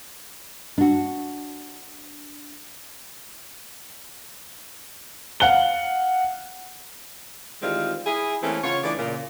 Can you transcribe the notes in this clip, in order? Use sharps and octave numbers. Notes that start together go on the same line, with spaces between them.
D4 F#4
F5 F#5 F#6 G7
D#3 E3 G3 G#3 C4 F4
E4 G#4
E3 A3 A#3 C4 C#4
C#3 B3 F4 C#5
E3 A3 D4 G#4 D5
A#2 C#3